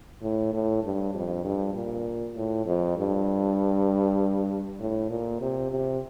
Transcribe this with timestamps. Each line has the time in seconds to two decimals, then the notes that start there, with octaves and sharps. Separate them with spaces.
0.22 A2
0.53 A2
0.84 G2
1.14 F2
1.45 G2
1.74 A#2
2.36 A2
2.66 F2
2.97 G2
4.80 A2
5.10 A#2
5.41 C3
5.71 C3